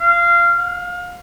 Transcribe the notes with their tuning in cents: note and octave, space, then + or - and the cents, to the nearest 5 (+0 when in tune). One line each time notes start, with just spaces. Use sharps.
F5 -20
F5 +30